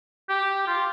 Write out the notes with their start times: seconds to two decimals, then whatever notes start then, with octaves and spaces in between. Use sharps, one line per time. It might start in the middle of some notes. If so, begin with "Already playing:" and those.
0.29 G4
0.67 F4